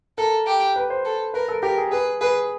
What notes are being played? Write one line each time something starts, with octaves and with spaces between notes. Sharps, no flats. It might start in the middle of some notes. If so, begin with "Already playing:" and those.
A4 A#4
G4
B4
C5
A4
A#4 B4
A4
G4 A#4
G#4
G#4 B4
G#4 B4